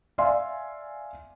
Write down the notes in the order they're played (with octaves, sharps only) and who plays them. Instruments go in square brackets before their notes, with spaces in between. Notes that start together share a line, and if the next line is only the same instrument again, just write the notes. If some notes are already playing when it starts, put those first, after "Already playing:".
[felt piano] D5 E5 F5 G#5 C6